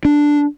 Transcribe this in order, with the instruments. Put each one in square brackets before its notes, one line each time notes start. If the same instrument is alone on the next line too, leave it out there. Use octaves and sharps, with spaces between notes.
[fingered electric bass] D4